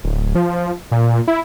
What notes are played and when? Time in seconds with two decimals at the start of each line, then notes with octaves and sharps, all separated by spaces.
0.04 D1
0.35 F3
0.91 A#2
1.28 E4